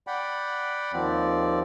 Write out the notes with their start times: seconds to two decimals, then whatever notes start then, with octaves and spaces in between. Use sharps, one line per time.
0.07 D5 F#5 G5 B5
0.93 D#2 F3 C4 D5